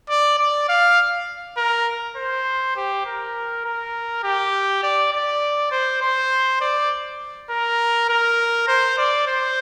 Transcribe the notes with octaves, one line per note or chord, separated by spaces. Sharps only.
D5
D5
F5
A#4
C5
G4
A#4
A#4
G4
D5
D5
C5
C5
D5
A#4
A#4
C5
D5
C5